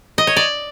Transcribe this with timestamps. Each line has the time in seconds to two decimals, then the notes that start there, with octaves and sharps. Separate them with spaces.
0.18 D#5
0.27 C#5
0.36 D5